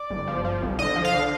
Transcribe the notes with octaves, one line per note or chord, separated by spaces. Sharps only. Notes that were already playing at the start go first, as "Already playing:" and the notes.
Already playing: D5
G1
F3
F3
C2
D3 D#5
F3
F5
D3